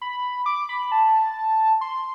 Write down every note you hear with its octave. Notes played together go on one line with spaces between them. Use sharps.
B5
D6
B5
A5
C6